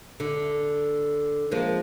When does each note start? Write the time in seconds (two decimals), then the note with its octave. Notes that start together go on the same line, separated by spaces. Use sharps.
0.20 D3
1.51 F3 G#3 A#3